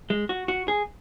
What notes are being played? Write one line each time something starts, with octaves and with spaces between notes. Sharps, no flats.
G#3
F#4
F#4
G#4